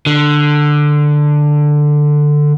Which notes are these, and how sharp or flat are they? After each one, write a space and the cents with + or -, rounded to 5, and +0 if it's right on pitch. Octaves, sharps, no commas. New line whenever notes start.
D3 +10